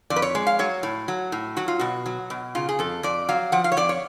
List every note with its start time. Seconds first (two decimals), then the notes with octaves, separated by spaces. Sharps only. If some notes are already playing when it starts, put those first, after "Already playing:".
0.10 F2 D5
0.16 B4
0.22 C#5
0.35 G#3
0.47 F5
0.59 F#3 C#5
0.83 A2
1.08 F#3
1.32 A2
1.57 F#3 F#4
1.68 F4
1.79 B2 F#4
2.06 F#3
2.30 B2
2.55 C#3 F4
2.69 G#4
2.79 F2 A4
3.03 F2 D5
3.29 F#3 F5
3.52 F3 F#5
3.64 F5
3.72 C#5
3.77 F2 D5
3.89 C#5